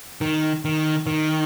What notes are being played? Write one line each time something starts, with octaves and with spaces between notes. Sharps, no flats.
D#3
D#3
D#3